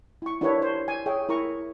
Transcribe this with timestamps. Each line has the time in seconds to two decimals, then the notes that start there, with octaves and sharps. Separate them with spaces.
0.22 E4 C#6
0.41 D4 E4 G4 A#4 B4 C#5
0.62 C5
0.88 G#5
1.06 G#4 C#5 E5 G5
1.29 E4 A#4 A#5 C#6